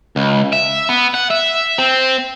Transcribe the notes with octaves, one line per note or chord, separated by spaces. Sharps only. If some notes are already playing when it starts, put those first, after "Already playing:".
C#2
E5
B3
F#5
E5
C4